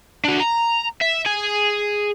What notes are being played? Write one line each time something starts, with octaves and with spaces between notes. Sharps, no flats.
D4 F#4
A#5
E5
G#4 G#5